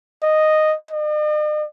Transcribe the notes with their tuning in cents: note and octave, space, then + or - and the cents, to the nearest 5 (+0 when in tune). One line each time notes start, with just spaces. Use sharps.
D#5 -5
D#5 -45